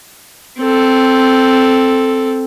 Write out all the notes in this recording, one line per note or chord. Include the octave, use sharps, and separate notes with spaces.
C4 A4